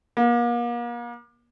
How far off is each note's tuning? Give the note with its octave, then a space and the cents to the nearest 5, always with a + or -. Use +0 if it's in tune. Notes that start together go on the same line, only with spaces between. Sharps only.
A#3 +40